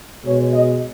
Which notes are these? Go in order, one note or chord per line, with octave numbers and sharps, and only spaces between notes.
B2 G#3 C#5
D#5